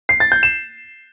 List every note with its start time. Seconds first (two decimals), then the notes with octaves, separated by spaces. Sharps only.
0.09 C7
0.20 A6
0.32 G6
0.43 E7